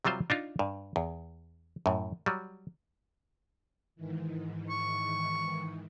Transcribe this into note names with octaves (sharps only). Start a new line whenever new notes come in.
C3 F#3 G3 F4 C5
D4 D#4 F4
G2
E2
F#2 A2
F#3 G3
G#2 D#3 E3
C#6